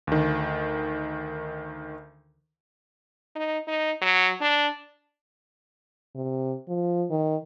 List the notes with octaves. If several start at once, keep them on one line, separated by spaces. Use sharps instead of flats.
D2 D#3
D#4
D#4
F#3
D4
C3
F3
D#3